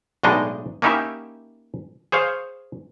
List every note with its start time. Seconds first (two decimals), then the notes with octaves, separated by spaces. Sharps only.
0.23 B1 A2 G#3 D4 D#4 D#5
0.82 A#3 C#4 D#4 E4 G4 E5
2.12 G#4 C5 C#5 F5